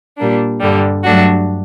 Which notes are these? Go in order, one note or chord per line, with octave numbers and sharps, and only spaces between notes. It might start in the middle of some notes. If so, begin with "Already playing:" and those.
A#2 G3 A#3 D4
G2 D3 G3
G2 F#3 A3 D4 F#4